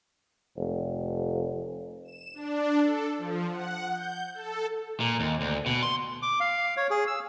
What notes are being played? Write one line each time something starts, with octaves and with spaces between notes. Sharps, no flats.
F1
E7
D4
A4
F3
F#5
G6
A4
A#2
D#2
D2
B2
C6
D6
F5
C#5
G#4
E6